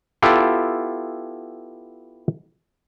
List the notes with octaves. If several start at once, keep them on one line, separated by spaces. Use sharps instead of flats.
B3 E4 F4 G4 A4